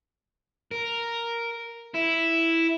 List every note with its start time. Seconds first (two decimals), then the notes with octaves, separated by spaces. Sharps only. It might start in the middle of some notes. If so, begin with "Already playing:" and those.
0.71 A#4
1.95 E4